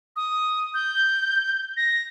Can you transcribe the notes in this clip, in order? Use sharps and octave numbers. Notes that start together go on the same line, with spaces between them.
D#6
G6
A#6